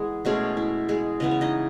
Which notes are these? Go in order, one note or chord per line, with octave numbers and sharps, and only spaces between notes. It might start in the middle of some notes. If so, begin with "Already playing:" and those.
Already playing: E3 G#3 B3 E4 G#4
B2 G#3 A3 C#4 G#4
E4
G#3 G#4
C#3 E3 B3 D#5
C#5
D#4 D#5